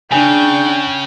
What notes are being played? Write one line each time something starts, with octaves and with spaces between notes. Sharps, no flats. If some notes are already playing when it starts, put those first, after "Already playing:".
C#3 D4 G5 G#5